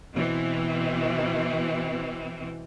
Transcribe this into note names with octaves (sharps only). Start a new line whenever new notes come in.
B2 E3 C4